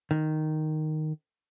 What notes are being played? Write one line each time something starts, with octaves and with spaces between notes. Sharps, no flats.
D#3